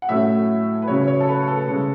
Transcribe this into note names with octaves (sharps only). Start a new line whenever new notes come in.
F#5
A2 F#3 A3 C#4 E5
B4
C#3 F#3 C#4 C#5
C#5
A4
B4
A4
C#3 G#3 C#4